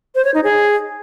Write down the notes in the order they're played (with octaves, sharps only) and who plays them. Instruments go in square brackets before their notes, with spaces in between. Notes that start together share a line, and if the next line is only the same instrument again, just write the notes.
[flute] C5
C#5
D#4
G#4